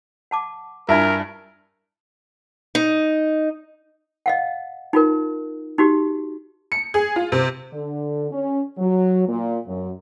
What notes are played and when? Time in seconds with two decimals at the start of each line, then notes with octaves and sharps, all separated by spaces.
0.31 F#5 A5 D6
0.89 G2 D4 E4 F4 A#4 E5 A5 G#6
2.75 D#4
4.26 D#5 F5 F#5
4.93 D#4 F4 A#4
5.78 D#4 F#4 G4
6.72 C#7
6.94 G#4
7.16 F4
7.32 C3
7.73 D3
8.32 C#4
8.79 F#3
9.28 A#2
9.68 F#2